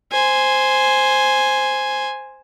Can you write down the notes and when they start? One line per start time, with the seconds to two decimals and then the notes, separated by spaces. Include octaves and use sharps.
0.12 C5 G#5